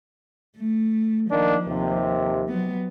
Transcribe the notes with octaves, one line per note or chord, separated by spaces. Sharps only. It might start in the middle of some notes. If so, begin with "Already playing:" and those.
A3
D#3 F3 A#3 D4
D#2 C3
F#3 B3